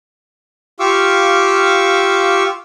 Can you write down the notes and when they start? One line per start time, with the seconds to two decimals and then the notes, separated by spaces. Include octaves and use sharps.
0.80 F4 G4 F5 C#6 D6 E6